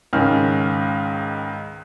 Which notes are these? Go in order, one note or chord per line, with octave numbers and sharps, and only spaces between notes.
C#2 G#2 D#3 C#4 F6